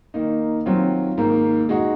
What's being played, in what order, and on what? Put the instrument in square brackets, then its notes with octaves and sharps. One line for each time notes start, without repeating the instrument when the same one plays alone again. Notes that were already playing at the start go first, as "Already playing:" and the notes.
[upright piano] D#3 A#3 D#4
D#3 F#3 C4 F4
G#2 D#3 A#3
G#3 D#4 F#4